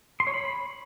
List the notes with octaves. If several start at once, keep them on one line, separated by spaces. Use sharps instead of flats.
C6
C#5
B5